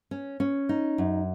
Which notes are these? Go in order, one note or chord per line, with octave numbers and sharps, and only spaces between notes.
C#4
C#4
D#4
F#2